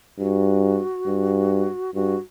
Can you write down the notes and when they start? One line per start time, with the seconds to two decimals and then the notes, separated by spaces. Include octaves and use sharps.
0.19 G2 F#4
1.07 G2
1.95 G2 F#4